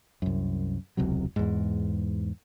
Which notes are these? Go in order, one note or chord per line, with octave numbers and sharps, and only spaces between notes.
C2 F#2
E1 C#2 C3 F#3
E2 G#2